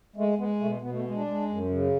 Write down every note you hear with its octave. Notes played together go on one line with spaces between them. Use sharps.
G#3 A3
G#3 B3
B2 A3
B2 B3
A3
B3
G#3
D4
G#3
F#2
C#3